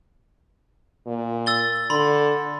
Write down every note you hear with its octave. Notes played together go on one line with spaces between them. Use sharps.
A#2
E6 A6 G7
D3 B5 C6